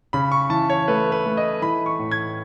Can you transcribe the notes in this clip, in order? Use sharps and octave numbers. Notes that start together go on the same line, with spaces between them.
C#3 B5
C#6
E3 A5
C#5
A3 B4
B4
A3
D#5
E3 B5
C#6
A2
G#6